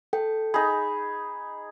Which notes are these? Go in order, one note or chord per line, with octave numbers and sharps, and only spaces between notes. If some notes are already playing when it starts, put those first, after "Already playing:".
A4 G5
D#4 G#4 B5